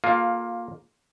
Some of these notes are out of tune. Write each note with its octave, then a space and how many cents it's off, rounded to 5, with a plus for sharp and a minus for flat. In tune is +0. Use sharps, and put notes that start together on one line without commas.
A#3 +0 F4 +15 A4 -35